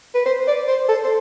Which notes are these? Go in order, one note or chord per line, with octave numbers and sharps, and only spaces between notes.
B4
C5
D5
C5
A4
C5